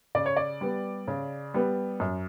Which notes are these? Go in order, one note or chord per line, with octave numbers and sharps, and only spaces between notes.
C#3 D5
C#5
D5
G3 B3
C#3
G3 B3
F#2